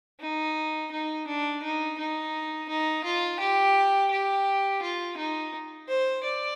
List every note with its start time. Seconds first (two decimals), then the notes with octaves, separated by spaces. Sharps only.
0.21 D#4
0.91 D#4
1.27 D4
1.63 D#4
1.98 D#4
2.69 D#4
3.04 F4
3.40 G4
4.11 G4
4.82 F4
5.17 D#4
5.89 C5
6.24 D5